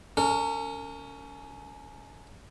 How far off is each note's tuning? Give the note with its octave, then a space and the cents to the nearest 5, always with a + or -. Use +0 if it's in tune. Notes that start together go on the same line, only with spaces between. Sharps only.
C#4 +20 A#4 -40